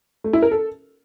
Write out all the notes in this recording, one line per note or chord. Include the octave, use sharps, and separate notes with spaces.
A3
E4
A#4
A4